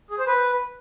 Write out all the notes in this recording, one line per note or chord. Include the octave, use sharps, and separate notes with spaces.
G#4
C5
B4